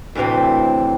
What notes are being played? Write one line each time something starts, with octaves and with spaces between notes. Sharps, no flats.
D2 A2 C3 E3 C4